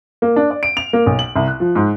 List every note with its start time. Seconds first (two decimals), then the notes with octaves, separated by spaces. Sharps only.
0.22 A#3
0.36 D4
0.51 D5
0.63 D7
0.77 F7
0.93 A#3
1.06 B1
1.19 F#7
1.36 C2
1.48 F#6
1.60 F3
1.75 G#2